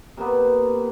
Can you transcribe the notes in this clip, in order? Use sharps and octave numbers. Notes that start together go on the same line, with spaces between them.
C3 A#3 B3